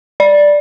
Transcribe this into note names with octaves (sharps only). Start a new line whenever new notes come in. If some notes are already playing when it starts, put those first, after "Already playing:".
D5